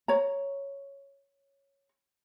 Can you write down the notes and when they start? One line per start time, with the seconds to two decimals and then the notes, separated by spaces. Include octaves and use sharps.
0.08 C#5 A#5